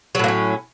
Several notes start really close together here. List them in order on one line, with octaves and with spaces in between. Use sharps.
F#3 A2 A#3 C#4